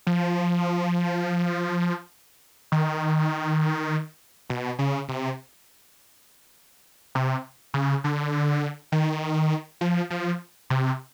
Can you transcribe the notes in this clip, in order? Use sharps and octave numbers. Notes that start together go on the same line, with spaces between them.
F3
D#3
B2
C#3
C3
C3
C#3
D3
D#3
F3
F3
C3